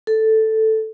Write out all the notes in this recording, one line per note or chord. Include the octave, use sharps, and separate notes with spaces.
A4